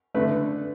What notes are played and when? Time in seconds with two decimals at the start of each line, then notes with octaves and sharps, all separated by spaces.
0.14 D3 A3 B4